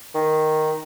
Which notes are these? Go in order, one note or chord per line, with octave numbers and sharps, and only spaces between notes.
D#3